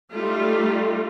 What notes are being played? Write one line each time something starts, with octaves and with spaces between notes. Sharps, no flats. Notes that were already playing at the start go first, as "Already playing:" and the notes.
G3 A3 D#4 F4